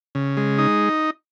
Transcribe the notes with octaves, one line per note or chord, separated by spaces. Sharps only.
C#3
G#3
D#4